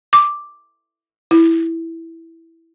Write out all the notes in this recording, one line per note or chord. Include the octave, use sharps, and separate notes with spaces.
D6
E4